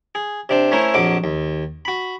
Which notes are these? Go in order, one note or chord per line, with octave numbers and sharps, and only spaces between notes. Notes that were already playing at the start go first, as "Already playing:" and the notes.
G#4
C3 D4 C5
A3 C#4 E4 A#4 C5 C#5
A#1 F2 F#3 F#5 D6
D#2
F#4 B5